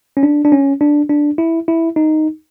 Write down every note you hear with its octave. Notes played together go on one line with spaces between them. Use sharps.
C#4
D4
D4
C#4
D4
D4
E4
E4
D#4